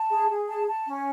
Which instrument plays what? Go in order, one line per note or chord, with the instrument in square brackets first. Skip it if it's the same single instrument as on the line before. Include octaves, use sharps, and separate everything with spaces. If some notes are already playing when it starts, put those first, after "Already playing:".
Already playing: [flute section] A5
G#4
G#4
A5
A5
C#4